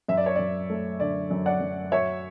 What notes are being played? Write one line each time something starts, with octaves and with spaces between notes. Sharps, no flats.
F#2 E5
D5
C#5
F#2 D5
A3
D3 D5
F#2
D5 F#5
F#2
F#3 C#5 E5